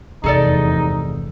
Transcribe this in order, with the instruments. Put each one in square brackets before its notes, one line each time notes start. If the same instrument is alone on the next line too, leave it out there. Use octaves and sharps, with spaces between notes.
[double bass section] F1 E2 [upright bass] G2 C3 [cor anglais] D#4 [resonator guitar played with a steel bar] G#4 A4 D5